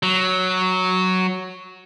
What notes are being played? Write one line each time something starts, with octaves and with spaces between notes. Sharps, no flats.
F#3